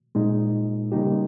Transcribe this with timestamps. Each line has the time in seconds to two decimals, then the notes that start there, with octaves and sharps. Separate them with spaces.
0.15 A#2 G#3 D#4
0.92 C#3 G3 A#3 D#4 G4